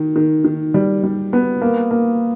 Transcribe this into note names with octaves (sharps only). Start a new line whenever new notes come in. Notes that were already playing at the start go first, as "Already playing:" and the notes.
Already playing: D#3
D#3
D#3
G3
G3
B3
A#3
A#3